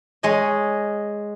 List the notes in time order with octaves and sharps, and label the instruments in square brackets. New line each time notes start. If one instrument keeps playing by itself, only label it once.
[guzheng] G#3 C#5 D#5